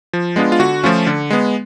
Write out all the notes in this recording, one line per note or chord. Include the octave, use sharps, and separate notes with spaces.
F3
G#3 B3 D4 F4
F4
D3 F#4
F3 A3 C#4 F4
D3
G#3 B3